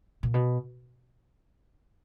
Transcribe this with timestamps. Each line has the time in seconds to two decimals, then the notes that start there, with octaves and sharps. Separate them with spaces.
0.23 A#2
0.34 B2